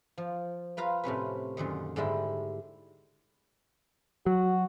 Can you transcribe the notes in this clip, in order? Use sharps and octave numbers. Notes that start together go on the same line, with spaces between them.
F3
F4 B4 F5 A#5
A2 C3 C#4 B4
F#2 A#2 D3 D#3
G#2 D3 G3 G#3 E4
F#3 F#4